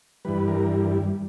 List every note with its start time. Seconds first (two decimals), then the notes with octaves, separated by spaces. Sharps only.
0.25 G2 E3 G3 B4
0.48 A#4